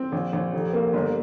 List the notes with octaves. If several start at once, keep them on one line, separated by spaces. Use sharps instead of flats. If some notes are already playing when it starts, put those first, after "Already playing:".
Already playing: C4
A#1
A#1
F1
A#3
G1